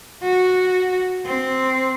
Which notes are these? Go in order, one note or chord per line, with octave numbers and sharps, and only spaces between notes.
F#4
C4